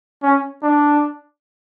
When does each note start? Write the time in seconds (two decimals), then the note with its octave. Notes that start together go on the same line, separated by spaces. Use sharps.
0.23 C#4
0.63 D4